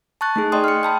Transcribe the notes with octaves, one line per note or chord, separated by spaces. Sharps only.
A5 C#6 F#6 A6
A3 D#4 G#4
D5 D#5 G5 C6 D#6
F6 C#7
G5 A5 B5